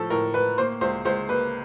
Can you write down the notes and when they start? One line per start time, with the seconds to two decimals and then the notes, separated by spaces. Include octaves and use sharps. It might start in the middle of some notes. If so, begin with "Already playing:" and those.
Already playing: A2 F3 A4
0.10 A2 A#4
0.34 A2 B4
0.58 A#3 C5
0.81 C#2 C5
1.05 C#2 C5
1.29 A#3 B4